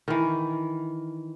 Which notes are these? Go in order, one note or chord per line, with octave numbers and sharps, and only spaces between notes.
D#3 E3